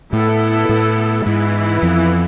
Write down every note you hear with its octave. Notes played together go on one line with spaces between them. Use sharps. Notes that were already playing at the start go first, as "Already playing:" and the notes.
A2 A3 B3 E4 A4
A2 A3
G#2 E3 G#3 B3 E4
F2 F3